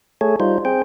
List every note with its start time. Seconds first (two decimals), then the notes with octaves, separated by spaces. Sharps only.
0.21 A3 G#4 A4 C#5
0.40 G3 D#4 F4 C5
0.65 C4 G#4 C5 G5